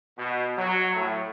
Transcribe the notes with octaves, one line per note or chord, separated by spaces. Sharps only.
B2
F#3
A2